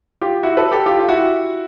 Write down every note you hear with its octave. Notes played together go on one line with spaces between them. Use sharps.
F4 G4
E4 F#4
A4 B4
G4 A4
F4 G4
F4
E4 F#4